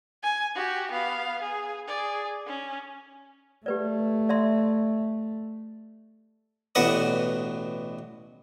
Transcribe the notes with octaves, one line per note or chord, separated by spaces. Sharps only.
G#5
F#4 G4
B3 F5
G#4
G#4 D5
C#4
A3 G4 B4 D5
D5 E5 C6
A1 B2 F#4 D5 C#6 D#6